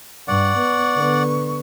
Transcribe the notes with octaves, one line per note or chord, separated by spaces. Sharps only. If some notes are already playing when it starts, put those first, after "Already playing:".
G2 D5 F#5 C#6
B3
D3 B3